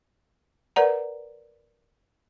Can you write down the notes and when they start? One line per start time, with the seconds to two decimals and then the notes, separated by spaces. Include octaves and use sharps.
0.76 A#4 B4 D5 F#5 A#5